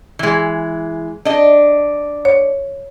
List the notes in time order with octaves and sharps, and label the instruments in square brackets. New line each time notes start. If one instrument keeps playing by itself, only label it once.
[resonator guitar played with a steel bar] E3 G#3
D4 D#5
[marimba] C#5